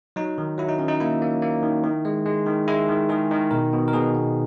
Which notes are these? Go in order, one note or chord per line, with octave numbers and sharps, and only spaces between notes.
F#3 D#4
D#3
F#3 E4
D#4
D#3 C#4
D#4
A#3 E4
A#3
A#3
D#3
D#3
G#3
G#3
D#3
G#3 E4
D#3
D#3 G#4
D#3
B2 A#4
B2
A#4
B2 G#4
B3